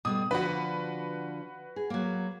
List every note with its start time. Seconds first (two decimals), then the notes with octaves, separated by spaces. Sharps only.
0.05 B2 G3 A3 D#6
0.31 D3 F3 D4 F#4 B4
1.76 G#4
1.90 F#3 A#3